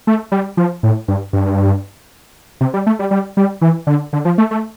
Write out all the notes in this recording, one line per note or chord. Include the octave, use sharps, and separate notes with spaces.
A3
G3
F3
A2
G2
G2
C3
G3
A3
G3
G3
G3
E3
D3
D3
F3
A3
A3